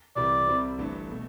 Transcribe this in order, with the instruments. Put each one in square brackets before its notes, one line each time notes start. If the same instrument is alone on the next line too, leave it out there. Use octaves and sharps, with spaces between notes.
[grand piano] C2 C3 E3 G3 [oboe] D5
[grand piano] C2 C3 G3 C4 E4
G1 G2 E3 A3
B2 A3